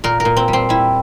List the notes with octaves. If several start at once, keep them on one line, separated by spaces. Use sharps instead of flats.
A#2 A#4
A#4
A#2
C4
G3
C4
G3 E4